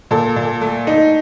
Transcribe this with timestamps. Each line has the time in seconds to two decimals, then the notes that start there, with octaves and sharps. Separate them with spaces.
0.11 A#2 A4
0.36 A#2
0.61 A3
0.87 D#4